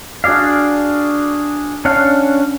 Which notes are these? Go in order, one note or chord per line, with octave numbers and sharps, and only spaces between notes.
D4 F#4 G#4 D5 F5
C#4 D4 F5 F#5